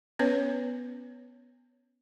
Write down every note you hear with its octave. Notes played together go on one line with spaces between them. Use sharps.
B3 C#4 B4 C#5